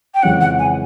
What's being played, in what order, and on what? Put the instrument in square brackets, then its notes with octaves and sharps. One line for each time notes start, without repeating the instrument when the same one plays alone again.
[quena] G5
[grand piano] F2 C#3 E3 G#3 C#4 [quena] F#5
[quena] F#5
G#5